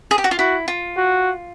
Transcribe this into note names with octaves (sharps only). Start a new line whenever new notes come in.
G#4
G4
F#4
F4
E4 F#4
F4
F#4